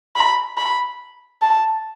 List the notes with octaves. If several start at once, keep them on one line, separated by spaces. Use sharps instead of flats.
B5
B5
A5